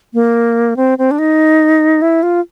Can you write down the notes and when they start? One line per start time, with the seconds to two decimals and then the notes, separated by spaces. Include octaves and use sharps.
0.14 A#3
0.77 C4
0.98 C4
1.11 D4
1.19 D#4
2.02 E4
2.23 F4